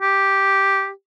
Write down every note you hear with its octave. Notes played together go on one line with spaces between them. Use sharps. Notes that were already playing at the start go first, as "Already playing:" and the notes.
G4